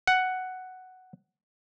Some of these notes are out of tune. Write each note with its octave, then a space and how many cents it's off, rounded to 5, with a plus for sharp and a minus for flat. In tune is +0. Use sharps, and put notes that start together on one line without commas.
F#5 +5